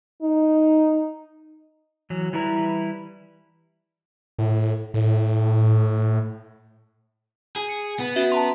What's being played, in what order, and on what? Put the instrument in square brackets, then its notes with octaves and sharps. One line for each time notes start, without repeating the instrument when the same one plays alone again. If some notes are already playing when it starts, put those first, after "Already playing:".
[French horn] D#4
[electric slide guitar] E3 F#3
E3 G3 E4 B4 A#5
[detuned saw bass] A2
A2
[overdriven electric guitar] G#4
[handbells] C#7
[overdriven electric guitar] B3
[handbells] C#4 F#4 E5
A5 A#5 C6